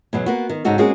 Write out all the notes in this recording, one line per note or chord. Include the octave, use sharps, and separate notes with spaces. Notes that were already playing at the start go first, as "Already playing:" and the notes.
E2 B2 F#3
A#3 B3 F#4
D#3
G#2 C#3 D#4 F#4 A4
G#3 A#3 C4 C#4 F#4 G#4